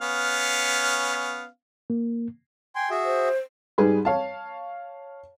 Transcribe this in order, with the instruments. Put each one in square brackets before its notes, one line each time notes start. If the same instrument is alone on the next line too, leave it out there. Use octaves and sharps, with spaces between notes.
[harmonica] B3 C#4 F5
[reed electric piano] A#3
[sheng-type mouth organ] G5 G#5 C6
F#4 G#4 E5
[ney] C5
[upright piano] G#2 G3 G#4 B4
C#5 F5 A5